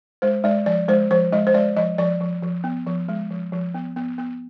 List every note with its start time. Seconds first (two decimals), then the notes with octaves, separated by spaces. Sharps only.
0.22 G#3 C5
0.44 G#3 D5
0.66 F3 D5
0.88 G#3 C5
1.11 F3 C5
1.32 G#3 D#5
1.47 C5
1.54 G#3 D5
1.76 F3 D#5
1.98 F3 D5
2.20 F3
2.42 F3
2.64 B3
2.87 F3
3.09 G#3
3.30 F3
3.52 F3
3.74 B3
3.96 B3
4.18 B3